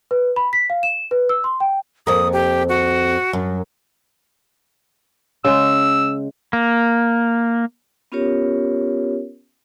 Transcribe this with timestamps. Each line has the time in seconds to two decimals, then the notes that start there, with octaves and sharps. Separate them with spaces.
0.11 B4
0.36 B5
0.53 B6
0.70 F5
0.83 E7
1.11 B4
1.29 E6
1.44 C6
1.60 G5
2.07 F2 A#3 D#6
2.33 G4
2.69 F#4
3.33 F#2
5.45 C#3 G#3 E6
6.53 A#3
8.12 B3 C#4 F4 G4 A#4 C#5